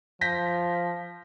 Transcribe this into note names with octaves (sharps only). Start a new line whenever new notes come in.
F3 G6 A#6 B6